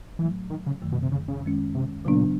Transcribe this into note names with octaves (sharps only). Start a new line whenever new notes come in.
A2 E3 F#3 A3
D#3
C#3
F#2 D#3 F#3 A3
B2
C3
C#3
C#3
F#2 D#3 G#3 C#4
C3
A#2 C#3 F#3 B3 D4